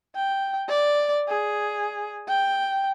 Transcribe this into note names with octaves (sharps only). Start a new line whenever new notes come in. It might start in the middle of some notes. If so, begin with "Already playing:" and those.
G5
D5
G#4
G5